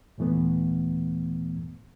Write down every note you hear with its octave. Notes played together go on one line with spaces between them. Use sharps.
D#2 A#2 E3 A3 B3